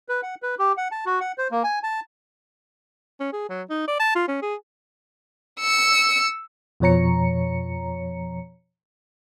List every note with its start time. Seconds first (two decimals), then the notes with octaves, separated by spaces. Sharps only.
0.09 B4
0.23 F#5
0.43 B4
0.59 G4
0.77 F#5
0.92 A5
1.06 F#4
1.21 F#5
1.38 C5
1.51 A#3
1.64 G#5
1.83 A5
3.20 C#4
3.33 G#4
3.49 F#3
3.70 D#4
3.88 D5
3.99 A5
4.15 F4
4.28 C#4
4.42 G#4
5.60 E6 C#7
6.80 F2 B2 F3 C#5 A#5 C#7